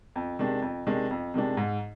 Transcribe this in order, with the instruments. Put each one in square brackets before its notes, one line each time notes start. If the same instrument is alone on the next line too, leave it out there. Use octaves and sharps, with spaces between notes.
[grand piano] F2
C3 D#3 G#3 D4
F2
C3 D#3 G#3 D4
F2
C3 D#3 G#3 D4
G#2